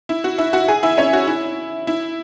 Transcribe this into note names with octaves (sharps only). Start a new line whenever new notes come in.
E4
F#4
E4 E5
F#4 F#5
G#4 G#5
E4 E5
C#4 C#5
F#4
E4
E4